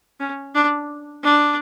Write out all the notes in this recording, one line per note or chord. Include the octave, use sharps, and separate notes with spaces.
C#4
D4
D4